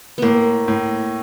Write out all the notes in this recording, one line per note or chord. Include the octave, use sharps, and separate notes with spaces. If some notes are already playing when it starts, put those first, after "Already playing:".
A2 A#3 B3
A2